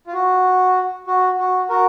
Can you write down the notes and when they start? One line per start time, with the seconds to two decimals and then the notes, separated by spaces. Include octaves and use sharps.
0.07 F4
0.13 F#4
1.07 F#4
1.39 F#4
1.69 F#4 A#4